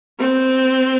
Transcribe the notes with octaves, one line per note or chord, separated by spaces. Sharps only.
C4